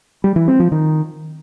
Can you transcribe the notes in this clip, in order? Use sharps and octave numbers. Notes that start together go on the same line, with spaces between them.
G3
E3
C4
F3
D#3